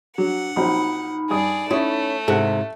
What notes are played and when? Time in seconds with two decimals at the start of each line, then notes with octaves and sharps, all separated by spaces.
0.18 F#3 D4 F#5
0.56 A#1 F#3 C4 D#4 B5
1.30 G2 G#4 D5 D#6
1.71 A3 C#4 E4 C#5 D#6
2.28 G#2 C3 A4 E5 F#5